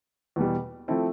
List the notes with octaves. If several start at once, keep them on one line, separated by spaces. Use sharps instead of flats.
E2 B2 G3
F3 A3 C4 E4 A4